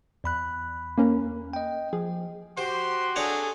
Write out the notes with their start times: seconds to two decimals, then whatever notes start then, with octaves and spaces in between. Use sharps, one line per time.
0.24 E2 B5 F#6
0.98 A#3 C#4 A#4
1.53 D#5 G5
1.93 F3 G#4
2.58 F#4 G4 C5 C6
3.16 D4 G#4 A4 C#5 A#5